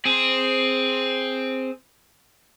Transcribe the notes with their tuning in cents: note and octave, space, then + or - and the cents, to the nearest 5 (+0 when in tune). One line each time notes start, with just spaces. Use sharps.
C4 +0 G#4 +0